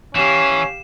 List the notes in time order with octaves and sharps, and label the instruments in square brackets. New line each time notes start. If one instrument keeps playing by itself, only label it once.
[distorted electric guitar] E3 [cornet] C#4 [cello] G4 F5 [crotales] E7